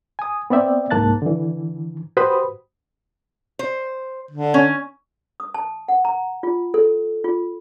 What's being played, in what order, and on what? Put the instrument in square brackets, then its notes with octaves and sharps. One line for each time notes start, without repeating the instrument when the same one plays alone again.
[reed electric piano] G#5 D#6
B3 C4 D5 E5 G5
C2 G#2 A#3 A5 F#6 A6
D3 E3
F#4 G4 B4 C5 B5 D#6
[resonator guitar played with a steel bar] C5
[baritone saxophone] D3
[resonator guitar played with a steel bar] C#4
[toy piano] D#6
A5
F#5
A#5
F4
A4
F4